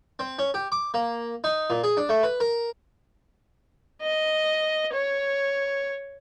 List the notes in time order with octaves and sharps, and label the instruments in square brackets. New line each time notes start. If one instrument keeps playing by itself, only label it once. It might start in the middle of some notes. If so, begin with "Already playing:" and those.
[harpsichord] C4
C#4
G4
D6
A#3
D#4
A#2
G#4
D4
A3
B4
A#4
[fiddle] D#5
C#5